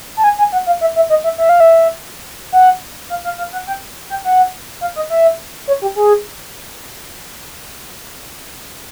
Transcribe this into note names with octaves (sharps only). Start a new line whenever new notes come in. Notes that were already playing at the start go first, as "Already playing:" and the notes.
A5
G#5
G#5
F#5
F5
E5
E5
D#5
E5
E5
F5
E5
F#5
F5
F5
F5
F#5
G5
G5
F#5
F5
D#5
E5
C#5
G4
G#4